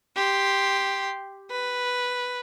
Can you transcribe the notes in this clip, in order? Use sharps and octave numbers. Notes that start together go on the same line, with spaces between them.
G4 C6
B4